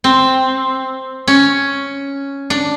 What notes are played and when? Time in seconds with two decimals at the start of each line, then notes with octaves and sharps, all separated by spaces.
0.04 C4
1.28 C#4
2.50 D4